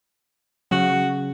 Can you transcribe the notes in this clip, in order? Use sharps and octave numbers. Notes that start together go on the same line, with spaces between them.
C#3 F#3 F#4